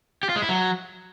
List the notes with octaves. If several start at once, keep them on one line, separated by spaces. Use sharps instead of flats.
G4
F4
G#3
E4
F#3